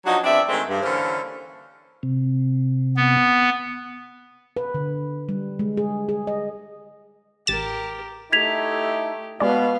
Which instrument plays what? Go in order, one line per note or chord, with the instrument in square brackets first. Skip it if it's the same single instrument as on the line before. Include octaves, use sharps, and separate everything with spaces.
[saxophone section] F3 F#3 D4 D#4 F#4
E2 C4 D4 D5 E5
D#3 G#3 A3 C4
G2
D3 E3 A#3 C#4 A#4 C5
[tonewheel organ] C3
[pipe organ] B3
[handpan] B4
D3
G3
G#3
G#4
G#4
D#5
[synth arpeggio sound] A1 A6 E7 [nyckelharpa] G4 A#4
[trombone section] A3 D#4 E4 [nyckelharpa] G4 [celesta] G#6 B6 F7
[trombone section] B2 [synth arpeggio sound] G#3 D5 [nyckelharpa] B3 F5